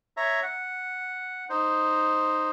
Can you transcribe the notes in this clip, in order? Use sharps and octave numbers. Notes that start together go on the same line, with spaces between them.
C#5 E5 A#5
F#5
D#4 C5